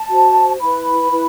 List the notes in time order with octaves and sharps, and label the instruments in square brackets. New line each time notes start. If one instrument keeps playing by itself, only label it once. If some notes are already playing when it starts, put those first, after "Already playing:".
Already playing: [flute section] A5
F#4 C5
E4 B4 B5
E4 B4